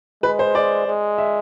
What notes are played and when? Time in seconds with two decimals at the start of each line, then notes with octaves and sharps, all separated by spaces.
0.23 G#3 B4
0.39 C5
0.55 D5
0.87 G#3
1.18 E5